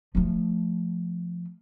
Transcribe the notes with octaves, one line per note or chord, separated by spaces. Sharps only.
F3 A3